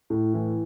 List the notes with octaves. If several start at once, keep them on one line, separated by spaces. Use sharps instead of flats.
A2
E3